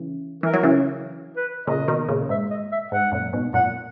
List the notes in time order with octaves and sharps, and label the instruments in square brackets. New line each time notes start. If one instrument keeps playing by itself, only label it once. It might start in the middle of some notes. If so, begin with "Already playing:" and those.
Already playing: [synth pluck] C#3 E3
[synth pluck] E3 [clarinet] A#4
[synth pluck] F#3
C#3 E3
[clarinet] B4
[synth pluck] A#2 C#3 [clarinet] D#5
[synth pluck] B2 D#3
A#2 C#3
[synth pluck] G#2 [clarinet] E5
[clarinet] D#5
E5
[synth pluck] G#2 [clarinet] F#5
[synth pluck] F#2 A#2
G#2 B2
[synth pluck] F#2 A#2 [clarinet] F#5